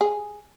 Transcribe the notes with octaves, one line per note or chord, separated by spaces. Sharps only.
G#4